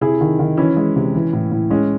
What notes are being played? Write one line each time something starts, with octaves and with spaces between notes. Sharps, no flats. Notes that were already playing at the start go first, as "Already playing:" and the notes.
C3 E4 G#4
D#3
D#3
E3 C#4 E4
G#3
C3
E3
A2
A2
G#3 C#4